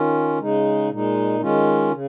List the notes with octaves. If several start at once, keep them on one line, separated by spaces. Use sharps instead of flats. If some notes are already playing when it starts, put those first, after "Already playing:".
Already playing: D#3 C#4 F4
C#3 G#3 D#4
A#2 G#3 D#4
D#3 G#3 C#4 F4
C#3